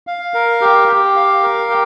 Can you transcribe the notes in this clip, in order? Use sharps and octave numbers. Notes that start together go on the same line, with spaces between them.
F5
A#4
G4
G4
F5
A#4
G4